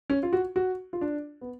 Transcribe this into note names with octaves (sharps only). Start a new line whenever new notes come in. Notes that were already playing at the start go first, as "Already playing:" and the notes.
C#4
F4
F#4
F#4
F4
D4
B3